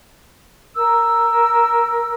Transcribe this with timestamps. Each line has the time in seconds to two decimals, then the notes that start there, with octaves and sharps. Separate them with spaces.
0.75 A#4 E6